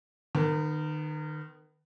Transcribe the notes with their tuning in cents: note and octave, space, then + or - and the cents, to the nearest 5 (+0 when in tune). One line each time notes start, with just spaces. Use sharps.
D#3 -30 B3 +10